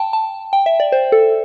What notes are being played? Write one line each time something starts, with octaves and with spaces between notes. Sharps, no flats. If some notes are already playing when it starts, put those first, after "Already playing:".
Already playing: G5 A5
A5
G5
E5
D5
C5
A4